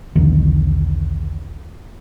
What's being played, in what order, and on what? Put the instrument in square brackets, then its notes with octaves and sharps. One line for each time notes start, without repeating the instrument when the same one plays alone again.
[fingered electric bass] B1 E2 D3 D#3